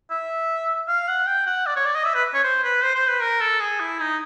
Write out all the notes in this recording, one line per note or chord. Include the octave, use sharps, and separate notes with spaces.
E5
F5
F#5
G5
F#5
D5
C#5
D5
D#5
E5
B4
C#5
C5
B4
C5
C5
B4
A#4
A4
G#4
E4
D#4